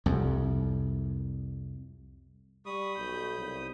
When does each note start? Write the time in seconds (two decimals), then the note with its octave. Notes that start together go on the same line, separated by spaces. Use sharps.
0.06 C2 F2
2.66 G3 B5 C#6 D#6
2.98 B1 G6
3.39 C2